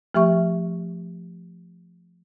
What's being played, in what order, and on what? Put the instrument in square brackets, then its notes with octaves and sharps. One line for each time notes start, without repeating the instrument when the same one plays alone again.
[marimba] F3 A3 G4 E5 C#6